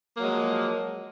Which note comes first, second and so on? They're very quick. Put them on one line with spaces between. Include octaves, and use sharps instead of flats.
A#3 F#3 G#3 F3